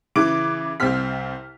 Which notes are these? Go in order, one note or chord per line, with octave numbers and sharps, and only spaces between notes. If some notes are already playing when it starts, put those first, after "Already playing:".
C#3 E3 D6 D7
C2 C3 C4 F6 B6